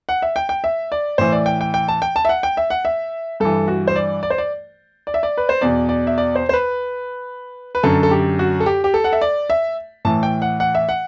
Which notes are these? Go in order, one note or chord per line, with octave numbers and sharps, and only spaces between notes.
F#5
E5
G5
G5
E5
D5
A2 E3 C5
D5
G5
G5
G5
A5
G5
A5
E5
F#5
G5
E5
F#5
E5
G2 E3 A4
F#4
C5
D5
D5
C5
D5
D5
E5
D5
B4
C5
E2 B2 D5
D5
E5
D5
C5
C5
B4
B4
F#2 D3 A4
A4
G4
F#4
A4
G4
G4
A4
F#5
E5
D5
E5
A2 E3 A5
G5
F#5
F#5
E5
F#5